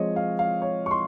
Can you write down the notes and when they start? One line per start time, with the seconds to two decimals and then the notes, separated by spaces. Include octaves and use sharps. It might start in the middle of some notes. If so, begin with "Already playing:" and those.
Already playing: F3 G#3 C4 C#5 D#5
0.16 F5
0.39 F5
0.62 C#5
0.86 C#6
0.91 C6